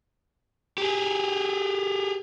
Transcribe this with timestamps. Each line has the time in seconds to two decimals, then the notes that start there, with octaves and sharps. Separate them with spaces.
0.78 G4 G#4